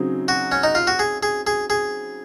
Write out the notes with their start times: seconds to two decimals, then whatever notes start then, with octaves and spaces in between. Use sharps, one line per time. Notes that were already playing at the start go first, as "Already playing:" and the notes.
Already playing: C#3 F#3 C4 D#4 G#4
0.28 F#4
0.52 C#4
0.63 D#4
0.75 F4
0.87 F#4
0.99 G#4
1.23 G#4
1.47 G#4
1.70 G#4